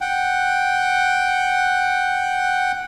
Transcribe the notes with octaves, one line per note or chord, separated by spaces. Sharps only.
F#5 G5